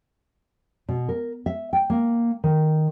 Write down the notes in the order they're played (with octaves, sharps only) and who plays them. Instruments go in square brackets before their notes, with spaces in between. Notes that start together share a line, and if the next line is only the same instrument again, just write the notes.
[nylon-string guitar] B2
A#4
E5
G5
A#3
D#3